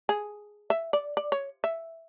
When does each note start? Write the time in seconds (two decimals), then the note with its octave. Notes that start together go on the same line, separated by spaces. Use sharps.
0.09 G#4
0.70 E5
0.93 D5
1.17 D5
1.32 C#5
1.64 E5